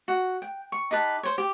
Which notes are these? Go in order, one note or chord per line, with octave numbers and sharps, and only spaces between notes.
F#4
G5
C#6
D#4 G4 B4 A5
C5 C#5
G4